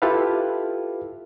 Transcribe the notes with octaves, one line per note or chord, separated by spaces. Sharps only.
E4 F4 G4 A4 B4 F5